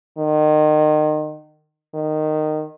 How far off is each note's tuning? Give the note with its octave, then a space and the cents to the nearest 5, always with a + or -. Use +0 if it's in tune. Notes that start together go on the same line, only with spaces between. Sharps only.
D#3 -30
D#3 -15